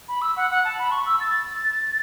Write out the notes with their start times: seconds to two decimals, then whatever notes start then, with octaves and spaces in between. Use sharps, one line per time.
0.08 B5
0.22 E6
0.37 F#5
0.51 F#5
0.65 A5
0.79 B5
0.92 C#6
1.06 E6
1.20 A6